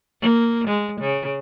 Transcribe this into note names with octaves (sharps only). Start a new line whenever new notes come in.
A#3
G#3
C#3